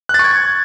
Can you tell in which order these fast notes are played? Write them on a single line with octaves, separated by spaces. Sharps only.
F#6 A6 C#6 G#6